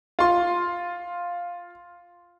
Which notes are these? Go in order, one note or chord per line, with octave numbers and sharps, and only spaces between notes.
F4 C6